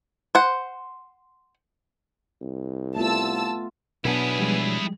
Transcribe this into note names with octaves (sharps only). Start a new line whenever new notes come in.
C5 F#5
C2
A3 B3 F4 A5 E6
B2 F#3 B3 D4 E4 G#4
F3 G3 G#3